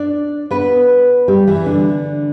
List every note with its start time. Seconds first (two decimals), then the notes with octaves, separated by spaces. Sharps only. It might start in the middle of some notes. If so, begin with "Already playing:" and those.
Already playing: D4 D5
0.51 B3 B4
1.28 G3 G4
1.47 E3 E4
1.66 D3 D4